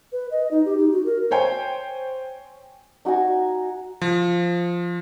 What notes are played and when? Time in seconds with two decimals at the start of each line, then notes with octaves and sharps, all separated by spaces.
0.12 B4
0.31 D#5
0.51 D#4
0.66 G4
0.78 D#4
0.92 F#4
1.06 A#4
1.31 C5 C#5 G5 G#5
3.05 D#4 F#4 F#5 G#5
4.02 F3